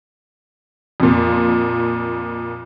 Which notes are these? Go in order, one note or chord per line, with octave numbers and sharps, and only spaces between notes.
F2 A#2